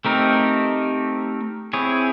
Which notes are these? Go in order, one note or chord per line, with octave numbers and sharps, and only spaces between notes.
A3 C4 D#4 G4 A#4
C4 E4 G#4 C#5